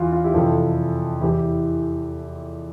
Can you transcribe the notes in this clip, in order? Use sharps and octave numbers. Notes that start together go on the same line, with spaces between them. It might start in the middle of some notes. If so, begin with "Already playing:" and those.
Already playing: E2 E3 F4
F4
E4 G4
F2 C3 E3 F4 A4
E2 E3 E4 G4